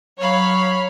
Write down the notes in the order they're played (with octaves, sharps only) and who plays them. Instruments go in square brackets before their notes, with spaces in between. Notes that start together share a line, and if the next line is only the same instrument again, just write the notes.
[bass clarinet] F#3 [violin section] C#5 F5 B5